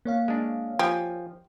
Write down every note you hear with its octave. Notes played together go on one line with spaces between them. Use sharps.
A#3 C#5 F5
G#3 D4
F3 G4 G#5